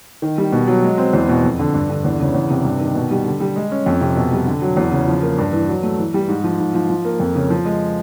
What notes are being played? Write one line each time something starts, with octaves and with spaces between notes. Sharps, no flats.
D#3
G3
B2
F#3
G#3
C4
E2
B2
F2
D3
G2
D3
E2
C#3
E2
C3
G2
D#3
B2
G3
D3
G3
G#3
C#4
F2
C3
B2
G3
D3
F#3
E2
C#3
F3
A#3
G2
E3
F#3
A3
E3
G3
G#2
F3
G#2
F3
F3
A#3
F2
C#3
F3
G#3